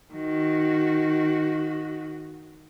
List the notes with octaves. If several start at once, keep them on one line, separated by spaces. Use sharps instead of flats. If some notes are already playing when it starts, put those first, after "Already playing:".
D#3 F#4